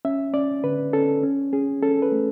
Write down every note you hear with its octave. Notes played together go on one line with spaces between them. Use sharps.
C#4 E5
C#4 D5
D3 B4
C#4 A4
C#4
C#4 G#4
C#4 A4
B4
A3